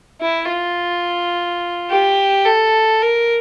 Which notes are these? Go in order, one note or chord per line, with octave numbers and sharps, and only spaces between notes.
E4
F4
G4
A4
A#4